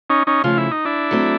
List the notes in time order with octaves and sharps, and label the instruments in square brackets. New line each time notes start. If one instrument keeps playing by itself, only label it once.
[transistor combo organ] C#4 D#4
C#4 D#4
[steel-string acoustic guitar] C#3 F3 A3 [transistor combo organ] F4
[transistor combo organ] E4
D#4
D4 E4
[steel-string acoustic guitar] F#3 A3 C4